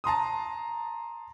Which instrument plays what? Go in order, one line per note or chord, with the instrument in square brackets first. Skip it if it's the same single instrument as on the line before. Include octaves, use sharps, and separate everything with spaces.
[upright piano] A5 A#5 C6 D#6